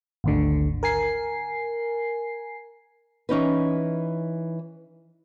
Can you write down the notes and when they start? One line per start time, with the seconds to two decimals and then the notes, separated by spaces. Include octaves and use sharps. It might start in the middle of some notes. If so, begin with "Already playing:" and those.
0.24 G#1 D2 D3
0.83 A#4 G#5 C7
3.29 E3 C#4 D#4 B4